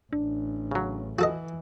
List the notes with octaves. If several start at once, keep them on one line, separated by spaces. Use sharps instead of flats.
A1 D4
C#3 F#3
E3 F#4 A4 D#5